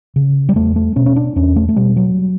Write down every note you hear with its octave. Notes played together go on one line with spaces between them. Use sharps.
C#3
G3
E2 A3
A3
B2 C#4
C#4
D4
E2 C#4
A3
A3
B2 G3
F#3